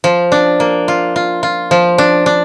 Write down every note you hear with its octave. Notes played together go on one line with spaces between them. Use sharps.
F3
D4
A#3
F4
F4
F4
F3
D4
D4